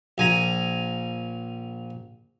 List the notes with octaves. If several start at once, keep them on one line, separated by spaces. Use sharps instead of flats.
A#1 G#5 A#5